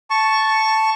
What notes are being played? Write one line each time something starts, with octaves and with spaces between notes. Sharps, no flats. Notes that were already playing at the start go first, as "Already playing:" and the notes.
A5 C#6